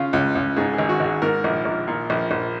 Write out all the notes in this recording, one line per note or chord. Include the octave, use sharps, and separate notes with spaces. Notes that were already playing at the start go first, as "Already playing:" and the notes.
Already playing: C#3 F4
C#2
C#2
G#2 G#4
G#1 G#4
F#4
G#1
G#4
G#2 A#4
A#1
A#1
A#2
A#1
A#1